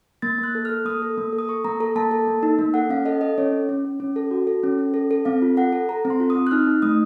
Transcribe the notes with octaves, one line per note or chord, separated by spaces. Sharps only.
A#3 A6
A#3 F#6
A4
A4 F6
A#3 D#6
A4
A#3
A4
D#6
A4 C#6
A#3 A#5
A4 A#5
A#3 A5
A4
A#3
D#4
A#3
A4 F#5
C#4 F5
A4 D#5
A4 D#5
C#4 C#5
C#4
C#4
C#4
C#4
A4
F#4
A4
C#4
C#4
A4
A4
C4 F5
F4
A4 F#5
A4
A4 A#5
C4
C6
F4
D#6
C4
F#6
D#4 F6
D#4
A3 D#6